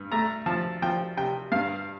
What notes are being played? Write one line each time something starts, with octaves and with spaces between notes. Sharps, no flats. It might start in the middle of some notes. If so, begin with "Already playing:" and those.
Already playing: G2
A3 A#5
F3 A5
F3 G5
C3 G5
G2 F5